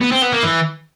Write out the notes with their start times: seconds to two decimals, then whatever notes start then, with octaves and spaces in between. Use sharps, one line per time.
0.01 B3
0.12 C4
0.22 B3
0.32 A#3
0.43 E3